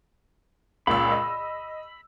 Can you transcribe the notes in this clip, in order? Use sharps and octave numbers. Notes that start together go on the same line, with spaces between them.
C#2 A#2 B5 E6
D#5